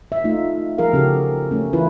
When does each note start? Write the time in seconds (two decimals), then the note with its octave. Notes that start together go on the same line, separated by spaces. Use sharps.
0.12 E5
0.24 A3 D#4 F4
0.78 F3 G#4 A#4 F5
0.93 C#3 C#4 F#4 G4 A4
1.51 A3 C#4
1.73 E3 E4 F4 B4